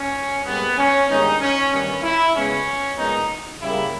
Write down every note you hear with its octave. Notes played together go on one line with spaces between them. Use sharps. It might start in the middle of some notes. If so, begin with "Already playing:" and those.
Already playing: C#4
G#2 G3 A#3 B3
C#4
G2 D#3 G#3 B3 D#4
C#4
G2 D#3 G3 B3 C#4
E4
C#3 G#3 B3 C#4
A#2 G#3 B3 D#4
C#3 G3 A#3 E4